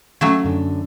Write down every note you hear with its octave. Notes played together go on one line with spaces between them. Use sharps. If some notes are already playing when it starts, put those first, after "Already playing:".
F#3 A3 C#4 F5
F#2 D3